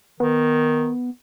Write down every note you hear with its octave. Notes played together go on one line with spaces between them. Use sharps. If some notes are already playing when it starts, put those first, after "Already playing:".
D#3 B3